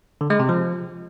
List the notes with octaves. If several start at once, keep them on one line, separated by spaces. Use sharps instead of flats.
D3
G#3
C3
F3